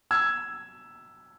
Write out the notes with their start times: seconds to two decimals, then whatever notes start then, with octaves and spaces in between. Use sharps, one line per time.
0.11 E6 G#6